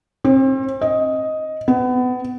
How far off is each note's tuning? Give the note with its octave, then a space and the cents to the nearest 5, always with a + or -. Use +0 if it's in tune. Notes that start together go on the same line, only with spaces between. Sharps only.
C4 +35
D#5 +5
B3 +25